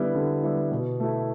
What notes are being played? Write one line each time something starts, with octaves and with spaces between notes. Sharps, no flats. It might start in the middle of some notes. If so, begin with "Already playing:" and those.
Already playing: D3 G3 B3 E4
D3
G3 B3 E4
B2
A3 E4